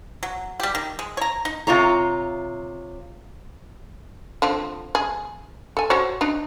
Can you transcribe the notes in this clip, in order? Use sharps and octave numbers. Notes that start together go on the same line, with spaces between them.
F#3
G3 G4
D#3
G#3
C#5 A#5
D#4
C3 F4 C#5 A#5
D3 F3 C4
G#4
A4 G#5
F#4 C5 C#5
D4 D#4